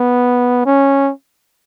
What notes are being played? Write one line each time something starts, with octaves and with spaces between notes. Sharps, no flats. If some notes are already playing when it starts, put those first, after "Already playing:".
Already playing: B3
C#4